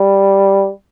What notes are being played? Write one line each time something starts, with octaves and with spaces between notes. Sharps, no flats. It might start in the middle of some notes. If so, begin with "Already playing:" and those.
Already playing: G3